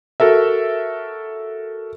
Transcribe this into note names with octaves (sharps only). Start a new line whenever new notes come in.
F#4 A4 A#4 E5